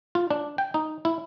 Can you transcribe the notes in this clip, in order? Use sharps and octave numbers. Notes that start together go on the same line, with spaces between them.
F4
D4
G5
D#4
E4